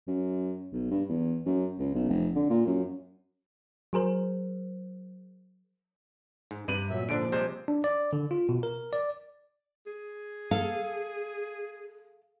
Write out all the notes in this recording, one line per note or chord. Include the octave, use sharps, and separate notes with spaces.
F#2
B1
G2
E2
F#2
C#2
B1
F1
D3
A#2
F#2
F#3 G#4 A#4 C5
G#2
G2 C3 B4 D#7 F#7
A#2 F#3 E5
G#2 D3 F3 D4 D7
C3 G3 G#3 C5
D4
D5
D3
F4
B2
A#4
D5
G#4
A4 F5